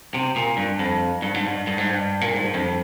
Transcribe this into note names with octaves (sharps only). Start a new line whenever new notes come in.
C3
A#2
G2
F2
G2
G#2
G2
G2
G#2
G2
A#2
G#2
G2
F2